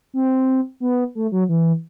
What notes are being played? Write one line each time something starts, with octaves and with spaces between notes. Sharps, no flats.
C4
B3
A3
F#3
E3